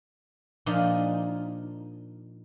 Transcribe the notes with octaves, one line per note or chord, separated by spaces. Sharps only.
A#2 F3 D4 D#4 G#5